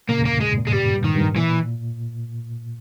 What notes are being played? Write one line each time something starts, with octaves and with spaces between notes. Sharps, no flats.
A#2 C#3 A#3
E2
G2 A#3
G#2 G#3
A#2
G#3
G2 G3
G2
D#3
G#2
G2
A#2 E3